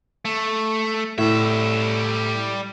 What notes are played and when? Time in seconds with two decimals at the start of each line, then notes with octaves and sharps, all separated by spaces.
0.25 A3
1.18 A2 G3 E5